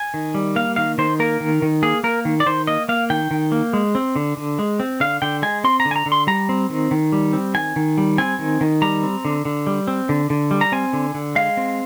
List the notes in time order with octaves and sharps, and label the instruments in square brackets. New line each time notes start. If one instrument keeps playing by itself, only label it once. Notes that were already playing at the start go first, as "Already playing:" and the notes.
Already playing: [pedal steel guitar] G#5
D#3
G3
A#3 F5
D#3 F5
D#3 C5
A#3 A#4
D#3
D#3
A#3 G#4
A#3 A#4
D#3
D5
D#3 C5
A#3 D#5
A#3 F5
D#3 G5
D#3
A#3
G#3
C4
D3
D3
G#3
C4
D3 F5
D3 G5
G#3 G#5
C4 C6
A#5
D3
G#5
A#5
D3
C6
G3 A#5
C4
D#3
D#3
G3
C4
D#3 G#5
D#3
G3
C4 G#5
D#3
D#3
G3 A#5
C4
D3
D3
G3
C4
D3
D3
G3
A#5
C4 G#5
D3
D3
G#3 F5
C4